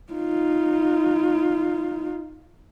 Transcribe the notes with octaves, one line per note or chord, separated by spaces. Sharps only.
D#4 F4